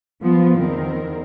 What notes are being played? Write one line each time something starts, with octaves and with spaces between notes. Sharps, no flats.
F3 B3 F4
E2 D#3 C4 A#4